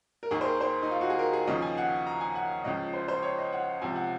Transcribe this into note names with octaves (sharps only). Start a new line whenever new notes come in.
A#4
D#2 D#3 G#4
C5
A#4
C5
D#4
F4
F#4
G#4
A#4
G#4
D#2 C#3 F3 D#5
G#5
F#5
A#5
G#5
F#5
C#2 C#3 F3 D#5
C5
C5
C#5
D#5
F#5
C#2 C3 F3 G#5
F#5